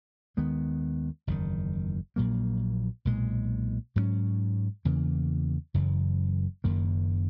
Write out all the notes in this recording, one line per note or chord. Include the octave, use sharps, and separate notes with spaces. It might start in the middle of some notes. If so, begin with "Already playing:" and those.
D#2 D#3 G#3 B3
F#1 E2 D#3
A#1 A#2 F#3 A#3
B1 A#2 G#3
G#2 F#3 A#3 C#4
E2 C#3 E3 A#3
F#1 F#2 C#3 E3
F#1 F#2 D#3 A#3